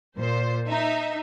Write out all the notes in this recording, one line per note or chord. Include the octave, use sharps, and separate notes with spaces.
A#2 C5
D#4 E5